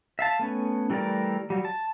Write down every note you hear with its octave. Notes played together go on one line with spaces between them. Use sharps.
E5 F5 A5
A3 B3 C#4
E3 G3 A3 A#4 D5
F#3 G3
A5